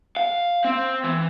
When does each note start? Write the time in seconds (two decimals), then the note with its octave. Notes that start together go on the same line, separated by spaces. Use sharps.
0.17 F5
0.65 C4
1.04 E3